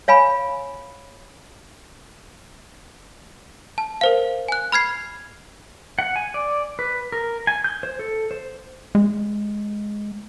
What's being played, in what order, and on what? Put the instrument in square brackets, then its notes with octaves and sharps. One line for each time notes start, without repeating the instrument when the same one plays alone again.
[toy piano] C#5 F5 G#5 B5
[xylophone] A5
A#4 C5 F5
G#5 F#6
B5 F6 G#6 C7
[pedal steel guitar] F#5
G#5
D5
B4
A#4
G#5
G6
C5
A4
C5
[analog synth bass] G#3